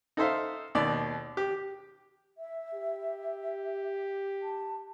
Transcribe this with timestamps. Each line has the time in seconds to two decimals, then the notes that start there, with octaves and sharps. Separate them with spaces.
0.17 D#4 A4 C5 E5 F5
0.75 D#2 B2 D5
1.37 G4
2.38 E5
2.74 G4
4.42 A5